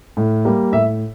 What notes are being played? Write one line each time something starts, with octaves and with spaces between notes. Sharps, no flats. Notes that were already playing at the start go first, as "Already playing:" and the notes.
A2
G3 A#3
A2 E5